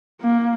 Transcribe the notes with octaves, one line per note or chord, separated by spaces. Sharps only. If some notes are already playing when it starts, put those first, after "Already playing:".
A#3